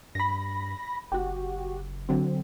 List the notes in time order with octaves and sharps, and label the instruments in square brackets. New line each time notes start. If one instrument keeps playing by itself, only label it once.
[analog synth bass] G2 [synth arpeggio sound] B5 A#6
[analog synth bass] F#1 [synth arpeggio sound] F#4 G4
[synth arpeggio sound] D3 F#3 C4